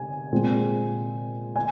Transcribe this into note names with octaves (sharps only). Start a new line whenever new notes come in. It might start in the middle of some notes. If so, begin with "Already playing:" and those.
Already playing: C3 G#5
A#2 G#3 C4
G#5